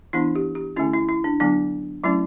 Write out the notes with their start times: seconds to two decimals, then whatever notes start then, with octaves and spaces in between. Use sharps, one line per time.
0.13 E3 B3 D4 E4
0.36 G4
0.55 G4
0.76 D3 A3 C#4 E4
0.93 E4
1.09 E4
1.24 D4
1.40 D3 F#3 B3 D4
2.04 F#3 A3 C#4 E4